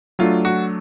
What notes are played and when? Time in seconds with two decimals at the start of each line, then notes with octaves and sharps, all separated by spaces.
0.19 F#3 A3 D4 F4
0.45 F#4